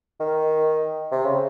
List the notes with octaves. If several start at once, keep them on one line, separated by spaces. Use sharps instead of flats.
D#3
C3
C#3